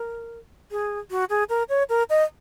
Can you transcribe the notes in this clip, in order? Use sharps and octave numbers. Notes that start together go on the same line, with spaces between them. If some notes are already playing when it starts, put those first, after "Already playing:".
Already playing: A#4
G#4
F#4
G#4
A#4
C#5
A#4
D#5